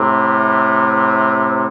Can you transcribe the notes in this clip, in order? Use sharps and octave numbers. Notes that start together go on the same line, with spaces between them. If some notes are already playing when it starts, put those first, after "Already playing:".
Already playing: A2 C3